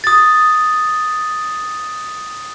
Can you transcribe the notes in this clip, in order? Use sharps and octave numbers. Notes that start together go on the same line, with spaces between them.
D#6 A6